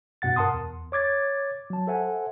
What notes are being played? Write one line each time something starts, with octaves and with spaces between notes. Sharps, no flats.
G2 B2 F#5 A6
A#4 F#5 A5 C6 D#6
E2
C#5 D6 G#6 A6
F#3 A5
A4 C5 E5 F#5 G#5